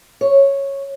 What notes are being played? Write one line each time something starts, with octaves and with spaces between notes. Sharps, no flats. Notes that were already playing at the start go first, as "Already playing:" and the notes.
C#5